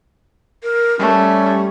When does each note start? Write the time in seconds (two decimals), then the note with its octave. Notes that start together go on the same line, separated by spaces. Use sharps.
0.63 A#4
0.99 G3 A3 C#4